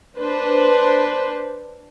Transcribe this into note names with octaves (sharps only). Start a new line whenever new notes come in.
D4 B4 C5